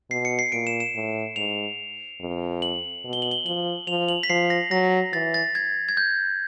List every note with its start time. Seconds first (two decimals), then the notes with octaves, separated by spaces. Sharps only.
0.10 B2 C7
0.25 C#7
0.39 C7
0.52 A#2 D7
0.67 E7
0.80 E7
0.95 A2
1.36 G#2 F7
2.21 F2
2.62 F#7
3.04 B2
3.13 G7
3.22 F#7
3.31 G7
3.45 F3 F#7
3.87 F3 F7
4.08 F#7
4.23 B6
4.30 F3 C7
4.50 A#6
4.71 F#3 A#6
5.13 E3 A6
5.34 A6
5.55 G#6
5.89 G#6
5.97 G6